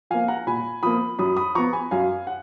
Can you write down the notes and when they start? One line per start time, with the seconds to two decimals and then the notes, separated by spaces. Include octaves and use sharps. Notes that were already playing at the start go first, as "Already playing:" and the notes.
0.10 F3 A#3 F5 G#5
0.28 F#5 A#5
0.47 A#2 G#5 B5
0.83 F3 A#3 B5 D#6
1.19 F#2 B5 D#6
1.37 B5 D#6
1.55 F3 B3 A#5 C#6
1.73 G#5 B5
1.91 F#2 F5 G#5
2.27 F#5